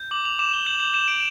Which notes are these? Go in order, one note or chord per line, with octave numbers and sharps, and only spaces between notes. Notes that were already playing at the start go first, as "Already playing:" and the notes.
Already playing: G6
D6 F#7
F7
D6 E7
G7
G6 F#7
F7
G6 E7
D7